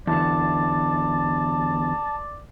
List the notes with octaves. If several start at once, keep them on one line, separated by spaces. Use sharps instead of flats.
E2 D3 D5 A5